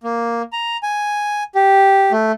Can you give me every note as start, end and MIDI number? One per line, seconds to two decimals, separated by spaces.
0.04 0.42 58
0.53 0.77 82
0.83 1.43 80
1.55 2.12 67
2.12 2.32 57